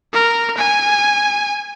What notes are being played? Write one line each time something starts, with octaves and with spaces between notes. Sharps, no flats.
A#4
G#5